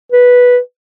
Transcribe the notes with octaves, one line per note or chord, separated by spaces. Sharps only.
B4